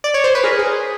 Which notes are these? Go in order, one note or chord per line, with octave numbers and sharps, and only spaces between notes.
D5
C#5
C5
B4
G#4 A#4
G#4